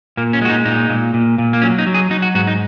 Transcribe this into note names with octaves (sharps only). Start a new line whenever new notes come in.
A#2 A#3
C#4
G#3 F#4
D#4
A#2 D#4
A#2
A#2
A#2
A#3
F#3 C#4
D#4
F#3
G#4
F#3 D#4
F#4
G#2 F#4
D#4